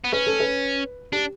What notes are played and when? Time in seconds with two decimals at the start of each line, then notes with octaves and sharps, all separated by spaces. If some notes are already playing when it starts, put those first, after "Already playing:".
0.04 B3
0.13 C#4 B4
0.27 A4
0.40 B4
1.12 D4 G4